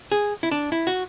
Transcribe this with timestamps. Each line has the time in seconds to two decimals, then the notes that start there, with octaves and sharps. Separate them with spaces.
0.12 G#4
0.43 E4
0.51 D4
0.72 E4
0.87 F#4